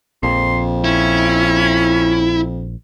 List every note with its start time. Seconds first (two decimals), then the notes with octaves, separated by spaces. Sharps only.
0.23 A#1 F2 C6
0.85 C#4 E4